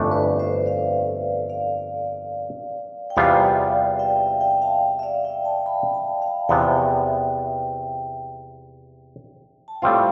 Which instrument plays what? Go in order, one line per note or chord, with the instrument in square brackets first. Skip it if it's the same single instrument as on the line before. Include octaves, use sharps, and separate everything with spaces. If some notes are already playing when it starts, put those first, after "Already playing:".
Already playing: [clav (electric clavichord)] G1 F2 E3 A3 D4
[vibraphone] B4 D5
C5 E5
D5 F5
D5 F5
G5
[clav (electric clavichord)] E2 C3 G3 B3 F4 [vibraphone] D5 F5
[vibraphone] E5 G5
E5 G5
F5 A5
E5
D5 F5
E5 G5
F5 A5
G5 B5
F5 A5
F5 A5
[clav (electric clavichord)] E2 C3 F3 B3 [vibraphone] E5 G5
[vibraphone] A5
G5
[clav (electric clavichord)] A2 G3 C4 F4 [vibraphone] D5 F5